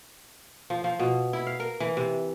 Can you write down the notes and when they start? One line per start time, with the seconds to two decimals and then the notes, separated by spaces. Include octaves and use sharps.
0.70 F3
0.84 F3
0.99 B2
1.33 E4
1.47 F5
1.60 A#4
1.80 E3
1.97 C3